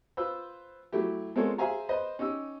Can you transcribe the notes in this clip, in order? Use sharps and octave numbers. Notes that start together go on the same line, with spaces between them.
F4 B4 C5 E6
F#3 A3 E4 G4
G#3 A#3 C4 F4 A4 C#5
G#4 C5 E5 F5 G#5 A#5
B4 C5 D#5
C#4 D#4 G4 E6